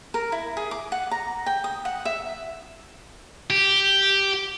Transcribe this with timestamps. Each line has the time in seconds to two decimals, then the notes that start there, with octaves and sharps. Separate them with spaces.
0.14 A#4
0.32 E4
0.57 G#4
0.71 D6
0.92 F#5
1.11 A#5
1.46 G5
1.64 D#6
1.85 F#5
2.05 E5
3.50 G4